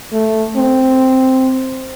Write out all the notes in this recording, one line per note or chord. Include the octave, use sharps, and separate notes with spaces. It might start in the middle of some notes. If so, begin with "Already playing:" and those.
A3
C4